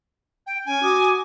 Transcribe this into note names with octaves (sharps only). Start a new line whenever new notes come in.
G5
C#4 G#5
F#4 D6 D#6